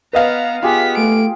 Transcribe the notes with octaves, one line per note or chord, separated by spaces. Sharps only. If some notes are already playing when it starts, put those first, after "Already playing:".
B3 B4 D#5 F5 A#5
B3 F4 G4 G#4 B6
A3 D7